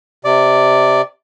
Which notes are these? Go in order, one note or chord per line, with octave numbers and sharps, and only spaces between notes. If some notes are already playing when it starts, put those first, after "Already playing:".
C3 D5